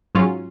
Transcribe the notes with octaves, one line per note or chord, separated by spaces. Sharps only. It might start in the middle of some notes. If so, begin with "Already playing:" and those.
G#2 F#3 C#4 F4